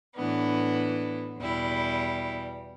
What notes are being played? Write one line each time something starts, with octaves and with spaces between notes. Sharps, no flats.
A2 E3 B3 D4
E2 B2 G3 E4